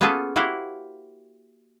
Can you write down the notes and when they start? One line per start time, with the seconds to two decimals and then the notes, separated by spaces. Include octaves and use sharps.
0.01 A#3 B3 C#4 F4 G#4 A4
0.36 A#3 E4 F#4 G4 C5 F5